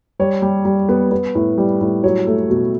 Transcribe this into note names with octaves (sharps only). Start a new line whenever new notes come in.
G3 C#5
G3
G3
B3
B3
A2
G3
A2
F#3 C#5
A3
B2